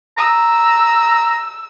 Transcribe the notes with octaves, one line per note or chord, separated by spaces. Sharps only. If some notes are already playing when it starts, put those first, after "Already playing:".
A#5 E6